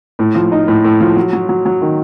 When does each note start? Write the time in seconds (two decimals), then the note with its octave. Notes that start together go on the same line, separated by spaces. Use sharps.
0.19 A2
0.35 F3
0.52 D#4
0.68 A2
0.84 A2
1.00 F3
1.16 F#3
1.33 F#3
1.49 F#3
1.65 F#3
1.81 D#3